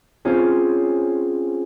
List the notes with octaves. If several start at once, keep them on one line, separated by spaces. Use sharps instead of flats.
C4 C#4 F4 G#4